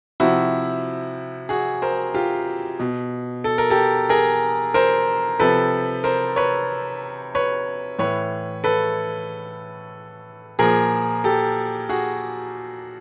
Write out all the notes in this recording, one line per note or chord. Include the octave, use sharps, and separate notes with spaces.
C3 F3 E4 F#4
F#4 G#4
A#4 C5
F4 G4
B2
A4
A#4
G4 A4
G#4 A#4
A#4 C5
C3 F3 A4 B4
A#4 C5
B4 C#5
B4 C#5
A2 E3 B4 C#5
A4 B4
A#2 F3 G#4 A#4
G4 A4
F#4 G#4